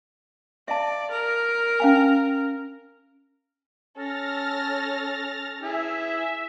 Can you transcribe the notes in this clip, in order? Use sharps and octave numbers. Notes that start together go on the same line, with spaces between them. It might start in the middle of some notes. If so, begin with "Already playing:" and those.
D5 E5 F5 A5
A#4
C#4 F5 G#5
C#4 A4 F6 A6 A#6
E4 G#4 E5